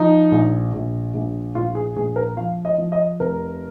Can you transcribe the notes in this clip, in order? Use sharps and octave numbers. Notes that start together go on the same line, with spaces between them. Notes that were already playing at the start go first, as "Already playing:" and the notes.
Already playing: F3 D#4
A#1
A#1
A#1
A#1 F4
G#4
A#1 G#4
A#4
F3 F5
D#5
F3
D#5
F1 A#4